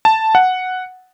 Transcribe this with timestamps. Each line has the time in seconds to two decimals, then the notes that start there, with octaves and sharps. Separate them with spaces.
0.05 A5
0.35 F#5